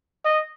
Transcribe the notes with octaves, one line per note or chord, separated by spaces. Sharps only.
D#5